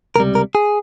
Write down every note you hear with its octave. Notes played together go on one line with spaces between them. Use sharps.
C#2 C3 G3 A#4
A#4
G#4